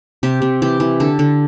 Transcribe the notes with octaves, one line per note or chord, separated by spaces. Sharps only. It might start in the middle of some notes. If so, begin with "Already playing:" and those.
C3 G4
C3
E3 G4
E3
D3 A4
D3